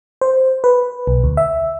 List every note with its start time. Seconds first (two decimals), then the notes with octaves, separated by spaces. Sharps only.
0.21 C5
0.64 B4
1.07 B1
1.24 D2
1.37 E5